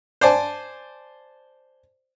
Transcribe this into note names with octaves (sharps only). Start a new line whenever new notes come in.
C5 D5 G#5 A5